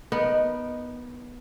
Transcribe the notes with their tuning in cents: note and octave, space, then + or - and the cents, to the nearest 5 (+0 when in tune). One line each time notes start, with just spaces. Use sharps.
B3 -10 D#4 -5 A#4 +15